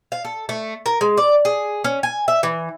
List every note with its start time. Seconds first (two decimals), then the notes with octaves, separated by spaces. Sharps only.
0.12 F5
0.25 A4
0.49 A3
0.86 A#4
1.01 G#3
1.17 D5
1.45 G#4
1.84 C#4
2.03 G#5
2.28 E5
2.43 E3